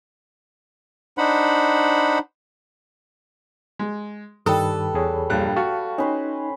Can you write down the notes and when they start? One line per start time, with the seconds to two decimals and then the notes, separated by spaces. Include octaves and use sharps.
1.18 D4 D#4 C5 F#5 B5
3.79 G#3
4.46 G2 D#3 G3 A4 B4 D#6
4.94 E2 G#4 C#5
5.30 A#1 G2 F#6
5.56 F#4 F5 A5 C#6
5.98 C#4 D#4 B4 C5